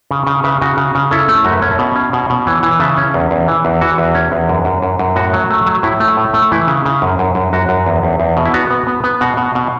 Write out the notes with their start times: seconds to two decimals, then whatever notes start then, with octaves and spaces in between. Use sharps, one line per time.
0.11 C#3
0.27 C#3
0.43 C#3 B4 E5
0.61 C#3 F#4
0.77 C#3
0.95 C#3
1.11 C#4 E4 A4
1.29 A3
1.45 F#2 F#4
1.53 B4 E5
1.62 C#4 C#5 F#5
1.71 E5 A5
1.79 B2
1.96 C#4
2.13 B2
2.30 B2
2.46 E3 C#5 F#5
2.63 E3
2.80 C#3 E5 A5
2.98 C#4
3.14 E2
3.31 E2
3.48 E3
3.65 E2
3.81 E3 F#4
3.98 E2
4.15 C#4
4.32 E2
4.49 F#2
4.65 F#2
4.82 F#2
4.99 F#2
5.16 A2 F#4
5.33 F#3
5.50 A3
5.66 F#3
5.83 A2 E4
6.00 A3
6.17 A2
6.34 A3
6.52 E3 E4
6.67 C#3
6.85 C#3
7.02 F#2
7.19 F#2
7.35 F#2
7.53 F#2 F#4
7.69 F#2
7.86 E2
8.03 E2
8.20 E2
8.37 B2
8.45 E4
8.54 B3 F#4
8.71 B3
8.87 B3
9.04 B3
9.21 B2 F#4
9.37 B2
9.55 B2